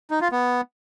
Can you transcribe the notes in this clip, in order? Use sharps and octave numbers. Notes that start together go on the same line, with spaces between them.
D#4
F4
B3